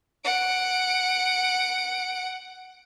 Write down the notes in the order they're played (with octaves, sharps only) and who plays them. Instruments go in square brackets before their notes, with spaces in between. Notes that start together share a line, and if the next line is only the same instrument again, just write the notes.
[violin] F#5 D7